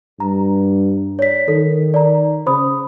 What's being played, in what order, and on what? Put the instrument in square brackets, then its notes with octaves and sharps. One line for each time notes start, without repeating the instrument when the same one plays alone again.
[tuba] G2 [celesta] A#5
[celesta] C#5 D5 B6
[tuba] D#3 [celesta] A4
[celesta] D5 A#5
[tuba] C#3 [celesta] C5 B5 D#6